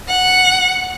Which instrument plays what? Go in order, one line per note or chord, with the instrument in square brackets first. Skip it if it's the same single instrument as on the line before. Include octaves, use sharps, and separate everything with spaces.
[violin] F#5